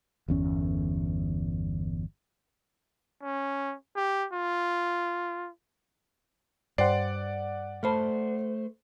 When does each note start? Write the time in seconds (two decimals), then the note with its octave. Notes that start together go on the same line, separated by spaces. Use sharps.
0.28 G1 E2 C#4
3.23 C#4
3.96 G4
4.33 F4
6.78 G2 C5 D5 F#5 G5 C6
7.83 A3 C5 A5 B5 F6